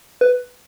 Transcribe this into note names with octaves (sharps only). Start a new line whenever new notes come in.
B4